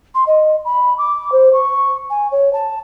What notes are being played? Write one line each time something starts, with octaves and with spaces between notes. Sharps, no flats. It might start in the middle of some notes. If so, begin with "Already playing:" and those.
C6
D#5
B5
D6
C5
C#6
G#5
C#5
A5